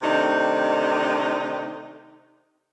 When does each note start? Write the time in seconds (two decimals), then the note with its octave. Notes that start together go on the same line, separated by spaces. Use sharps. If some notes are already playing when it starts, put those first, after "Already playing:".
0.03 C3 D#3 A3 D4 D#4